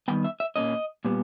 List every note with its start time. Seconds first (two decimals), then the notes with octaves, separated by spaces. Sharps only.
0.08 D#3 G3 B3 G5
0.24 E5
0.40 E5
0.56 A#2 A#3 C#4 D#5
1.05 A#2 G3 B3